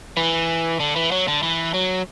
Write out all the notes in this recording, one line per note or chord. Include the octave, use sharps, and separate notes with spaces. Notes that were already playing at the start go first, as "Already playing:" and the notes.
E3
D3
E3
F#3
D3
E3
F#3